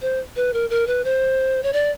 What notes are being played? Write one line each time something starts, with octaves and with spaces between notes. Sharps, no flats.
C5
B4
A#4
A#4
B4
C5
C#5
D5